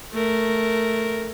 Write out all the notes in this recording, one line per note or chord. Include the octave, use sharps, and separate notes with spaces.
A3 A#4